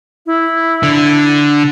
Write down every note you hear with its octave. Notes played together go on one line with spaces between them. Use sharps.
E4
D3